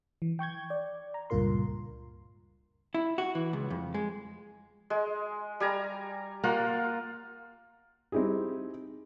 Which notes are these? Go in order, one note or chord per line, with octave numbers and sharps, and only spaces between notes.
E3
G5 C#6 G6 G#6
D5
A#5
C#2 G2 A#2 F4 A#4 C6
E4
F#4
E3
C#2
F2
G#3
G#3
G3 G#5 A#5
A#3 F4 F#5 A#5
C4 D#4 E4 G4 G#4